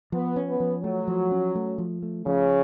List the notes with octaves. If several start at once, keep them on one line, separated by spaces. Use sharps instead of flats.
F3 B3
C#4
B3
F3
F#3 A3
F3
C#4
A3
F3
A3
C#3 F3